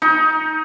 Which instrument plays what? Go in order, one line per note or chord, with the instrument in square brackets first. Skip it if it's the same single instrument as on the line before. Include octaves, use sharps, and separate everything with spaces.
[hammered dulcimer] D#4